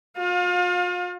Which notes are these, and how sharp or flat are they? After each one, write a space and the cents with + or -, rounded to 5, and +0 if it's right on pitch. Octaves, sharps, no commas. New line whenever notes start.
F4 +40 F5 +30